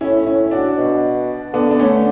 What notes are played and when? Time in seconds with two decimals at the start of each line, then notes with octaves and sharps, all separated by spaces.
0.01 A2 C#4 E4
0.26 C#4 E4
0.51 D4 F#4
0.78 B2
1.54 D3 B3 D4
1.71 D4
1.79 A3 C#4